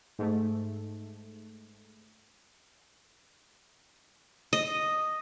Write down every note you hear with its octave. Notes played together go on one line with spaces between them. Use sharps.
G#2 A3
D#5